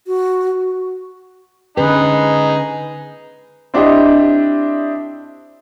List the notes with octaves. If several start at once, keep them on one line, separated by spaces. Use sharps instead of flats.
F#4
D3 C#4 D#4 G#4 B4
C4 D4 E4 G4 C5 D#5